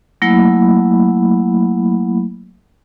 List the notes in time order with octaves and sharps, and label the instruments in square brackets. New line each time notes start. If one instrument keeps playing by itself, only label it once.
[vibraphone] F#3 A3 A#3 E4 B5